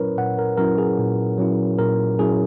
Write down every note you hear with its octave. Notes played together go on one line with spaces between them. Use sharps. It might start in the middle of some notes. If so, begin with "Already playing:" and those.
Already playing: A#2 F#3 C#4 E4 A#4 B4 C#5
A#2 F#5
A#4
F#3 C#4 E4 A#4
G#4
A#2
F#3 C#4 E4
A#2 A#4
F#3 C#4 E4 G#4